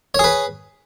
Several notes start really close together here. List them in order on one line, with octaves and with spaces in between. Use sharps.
C#5 G#4 B4